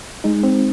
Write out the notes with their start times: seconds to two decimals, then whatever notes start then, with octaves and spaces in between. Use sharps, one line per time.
0.24 G#3 D#4
0.43 C4